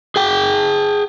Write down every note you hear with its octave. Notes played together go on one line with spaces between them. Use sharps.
G#4 G5